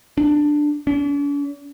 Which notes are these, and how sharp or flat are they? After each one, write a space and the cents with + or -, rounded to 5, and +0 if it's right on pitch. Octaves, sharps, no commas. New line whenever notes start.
D4 +10
D4 -45